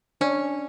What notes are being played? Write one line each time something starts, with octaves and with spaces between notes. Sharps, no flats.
C#4 D4